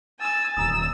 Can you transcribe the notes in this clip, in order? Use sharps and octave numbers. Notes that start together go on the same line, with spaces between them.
G#5 E6 A6
D#1 E2 A#5 D#6 E6